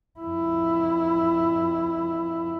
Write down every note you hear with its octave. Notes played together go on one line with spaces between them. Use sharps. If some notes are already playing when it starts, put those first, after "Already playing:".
F2 E4